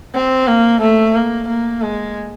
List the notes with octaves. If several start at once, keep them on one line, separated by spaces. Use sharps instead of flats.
C4
A#3
A3
A#3
A#3
G#3